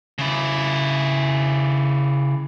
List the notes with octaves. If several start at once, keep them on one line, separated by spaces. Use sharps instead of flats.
C#3 E4